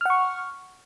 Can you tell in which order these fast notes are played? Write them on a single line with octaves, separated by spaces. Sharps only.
F6 F#5 C#6